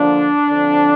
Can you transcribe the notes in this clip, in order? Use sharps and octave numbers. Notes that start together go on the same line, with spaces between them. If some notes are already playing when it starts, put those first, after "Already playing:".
Already playing: D3 F3 A#3 D4
D3 F3 C4